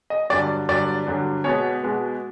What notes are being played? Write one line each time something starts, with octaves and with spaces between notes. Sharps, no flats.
D#5
G2 D3 F#3 D5
G2 D3 F#3 D5
G2 D3 F#3
B2 G#3 B3 C#5
B2 G#3 B3